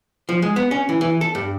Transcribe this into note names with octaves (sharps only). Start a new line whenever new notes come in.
F3
G#3
B3
C#4
E3
E3
A4
G2